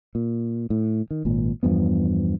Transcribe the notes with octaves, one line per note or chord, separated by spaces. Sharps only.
A#2
A2
D#3
G#1 A#2
E2 G2 F3 B3